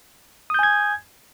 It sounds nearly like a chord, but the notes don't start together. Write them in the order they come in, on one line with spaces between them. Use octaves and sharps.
D#6 G6 G#5 G#6